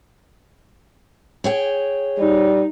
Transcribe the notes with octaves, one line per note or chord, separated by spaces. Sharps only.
G#4 C#5 G5
G3 D#4